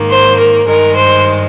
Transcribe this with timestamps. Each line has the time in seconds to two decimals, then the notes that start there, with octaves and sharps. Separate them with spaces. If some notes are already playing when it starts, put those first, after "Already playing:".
Already playing: G#2 D#3 A#3
0.10 C5
0.38 A#4
0.66 G2 D#3 G#3 A#4
0.95 C5